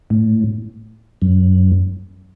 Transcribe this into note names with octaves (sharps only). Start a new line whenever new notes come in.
A2
F#2